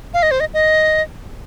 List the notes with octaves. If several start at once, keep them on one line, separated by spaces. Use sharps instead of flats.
F5
D#5
C5
D#5
D#5